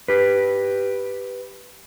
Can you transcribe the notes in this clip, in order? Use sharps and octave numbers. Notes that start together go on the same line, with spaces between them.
G4 B4